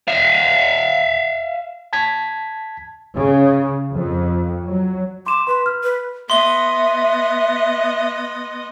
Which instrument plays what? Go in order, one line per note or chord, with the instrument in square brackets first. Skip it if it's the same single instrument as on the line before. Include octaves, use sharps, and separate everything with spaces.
[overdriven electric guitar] E5 F5
[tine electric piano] A5 G#6 B6
[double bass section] C#3
F2
F#3
[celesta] C6 E7 [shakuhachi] D6
[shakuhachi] B4 [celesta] C6
[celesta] F6
[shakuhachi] B4
[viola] B3 D#5 [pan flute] E5 [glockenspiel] C6 G7